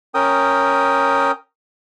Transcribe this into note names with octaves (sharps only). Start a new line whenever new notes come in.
C#4 A#4 G5 D#6